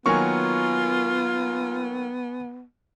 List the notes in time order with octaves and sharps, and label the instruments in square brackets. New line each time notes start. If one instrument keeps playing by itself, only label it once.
[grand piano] D#3 F#3 A#3 [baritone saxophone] B3 [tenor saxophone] F4 [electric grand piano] G#5 C#6